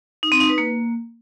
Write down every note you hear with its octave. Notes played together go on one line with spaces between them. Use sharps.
D#4
C4
D#4
B4
A#3